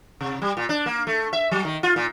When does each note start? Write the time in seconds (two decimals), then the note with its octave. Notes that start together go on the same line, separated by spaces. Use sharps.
0.21 C3
0.42 G3
0.57 A#2
0.69 D4
0.86 A#3
1.07 A3
1.33 E5
1.51 F#3
1.65 D#3
1.83 F4
1.96 A#2